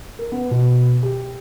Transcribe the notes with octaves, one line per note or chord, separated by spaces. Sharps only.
A#4
B3
B2
G4